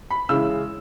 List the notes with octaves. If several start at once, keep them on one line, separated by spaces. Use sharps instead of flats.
B5
C#3 E3 G#3 C#4 E4 E6